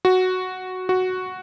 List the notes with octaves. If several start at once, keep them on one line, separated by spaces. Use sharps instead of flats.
F#4
F#4